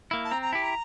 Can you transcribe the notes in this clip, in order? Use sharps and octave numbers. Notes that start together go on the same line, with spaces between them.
A#3 E4
A5
C4 A#5
A#5
E4 G4 A5
A#5